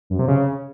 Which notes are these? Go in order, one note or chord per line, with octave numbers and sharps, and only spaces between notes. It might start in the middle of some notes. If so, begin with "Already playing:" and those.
F#2
C3
C#3